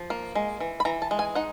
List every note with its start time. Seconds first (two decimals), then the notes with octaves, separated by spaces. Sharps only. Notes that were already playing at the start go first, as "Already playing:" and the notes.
Already playing: F3
0.10 A#3
0.35 G#3
0.60 E3
0.80 B5
0.85 E3 A#5
1.02 A5
1.11 G#3
1.19 G#5
1.35 D#4 F#5